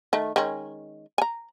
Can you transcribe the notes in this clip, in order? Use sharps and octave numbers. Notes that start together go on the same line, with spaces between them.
D#3 A3
D#3 G#3 C#4
G#5 A#5